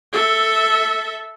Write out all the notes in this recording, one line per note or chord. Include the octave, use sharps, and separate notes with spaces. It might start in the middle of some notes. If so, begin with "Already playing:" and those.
A4 E5